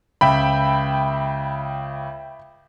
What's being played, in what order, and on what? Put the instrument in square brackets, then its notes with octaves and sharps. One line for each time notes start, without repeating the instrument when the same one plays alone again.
[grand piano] C#2 [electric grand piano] E5 G5 B5